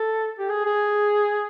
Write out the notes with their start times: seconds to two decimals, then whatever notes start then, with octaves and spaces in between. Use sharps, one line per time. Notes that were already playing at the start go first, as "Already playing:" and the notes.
Already playing: A4
0.39 G4
0.49 G#4
0.65 G#4